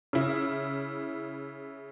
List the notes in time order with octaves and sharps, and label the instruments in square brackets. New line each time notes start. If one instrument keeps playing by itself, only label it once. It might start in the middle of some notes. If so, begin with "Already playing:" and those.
[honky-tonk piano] C#3 E4